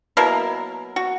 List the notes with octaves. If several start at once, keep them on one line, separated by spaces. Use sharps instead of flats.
B2 F#3 A#3 E4 A#4
F#4